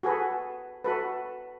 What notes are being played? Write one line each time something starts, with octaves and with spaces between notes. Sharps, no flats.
F#4 G#4 A4 B4
F#4 A4 B4